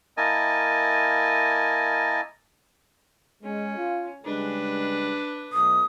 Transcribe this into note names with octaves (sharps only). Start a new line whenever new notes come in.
A#3 E4 A#4 D#5 G#5 A5
G#3 C#4
F4
C#3 G3 G#3 D4 B4
B2 F#3 A3 D#6